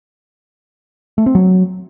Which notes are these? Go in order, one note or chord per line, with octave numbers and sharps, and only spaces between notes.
A3
C4
F#3